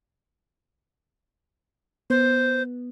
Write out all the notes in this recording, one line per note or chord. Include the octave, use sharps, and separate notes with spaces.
B3 C5